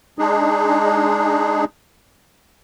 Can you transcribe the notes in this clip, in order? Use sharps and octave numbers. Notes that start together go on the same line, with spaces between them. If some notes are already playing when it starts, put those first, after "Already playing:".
G#3 D4 D#4 G#4